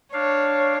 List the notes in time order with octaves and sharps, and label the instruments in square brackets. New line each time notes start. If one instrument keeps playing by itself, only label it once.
[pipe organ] D4 F5 [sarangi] C#5